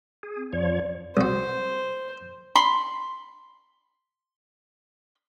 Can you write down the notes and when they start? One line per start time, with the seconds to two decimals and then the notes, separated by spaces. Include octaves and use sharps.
0.23 G#4
0.36 C4
0.53 F2 F3 C#5 D5
1.17 C2 F#4 C5
2.55 B5 C6